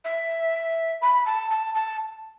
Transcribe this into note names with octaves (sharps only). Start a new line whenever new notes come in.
E5
B5
A5
A5
A5